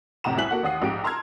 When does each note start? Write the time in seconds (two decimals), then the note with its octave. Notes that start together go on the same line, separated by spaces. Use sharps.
0.24 F1 A2 C3 F#5 A#5 E7
0.37 C2 E4 G#5 F#6 B6 F#7
0.51 A#3 F#4 A4 F#5
0.63 A1 D#2 F#5 D#6 C7
0.82 A#1 G#2 G4 D7
1.04 A5 A#5 C6 E6 F6 G#6